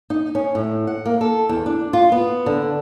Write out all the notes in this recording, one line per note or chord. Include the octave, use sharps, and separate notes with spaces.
D#4
C#4
A2
F#5
A#3
A4
E2
D4
F4
B3
D3